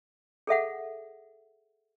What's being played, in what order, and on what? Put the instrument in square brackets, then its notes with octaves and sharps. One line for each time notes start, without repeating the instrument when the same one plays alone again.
[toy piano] G#4 A4 E5 F#5